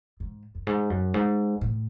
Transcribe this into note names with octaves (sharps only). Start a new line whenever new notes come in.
G#2
F#2
G#2
F#2
G#2
A2